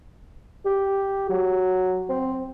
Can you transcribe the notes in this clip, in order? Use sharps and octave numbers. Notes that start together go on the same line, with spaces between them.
G4
F#3
C4